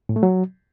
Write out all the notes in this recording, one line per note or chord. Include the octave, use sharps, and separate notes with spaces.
A2
A3
F#3